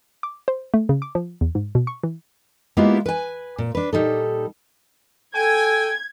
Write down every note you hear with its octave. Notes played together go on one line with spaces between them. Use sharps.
D6
C5
A3
C#3
D6
F3
E2
G#2
B2
C#6
E3
G#3 A#3 B3 E4 F4 G4
B4 G#5
A#2
D4 B4
A#2 G3 D#4 A4
A4 G5 G#5 G#6